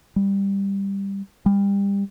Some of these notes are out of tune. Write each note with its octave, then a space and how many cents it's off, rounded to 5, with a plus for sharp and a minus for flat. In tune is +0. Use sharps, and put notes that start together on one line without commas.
G3 +10
G3 +25